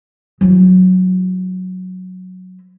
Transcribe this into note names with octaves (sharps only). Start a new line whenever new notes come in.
F#3 E4